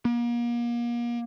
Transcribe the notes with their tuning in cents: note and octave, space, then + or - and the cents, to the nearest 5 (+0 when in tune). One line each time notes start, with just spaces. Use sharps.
A#3 +35